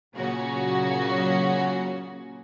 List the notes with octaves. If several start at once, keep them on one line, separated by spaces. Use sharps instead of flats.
A#2 C#3 F#3 A#3 C#4 F#4